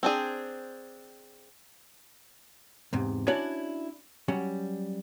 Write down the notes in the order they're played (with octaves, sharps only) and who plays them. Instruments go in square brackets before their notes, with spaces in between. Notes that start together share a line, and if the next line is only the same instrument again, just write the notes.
[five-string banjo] C4 D4 G#4
[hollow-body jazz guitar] E2 G#2 C3
C#4 D4 E4 F#4 C#5 D5
F#3 G3 C#4 F#5